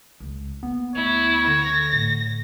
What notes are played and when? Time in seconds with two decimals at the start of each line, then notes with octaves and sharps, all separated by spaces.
0.20 C#2
0.63 A#3 B3
0.95 D2 E4 C#5
1.47 D3 A#6
1.93 A2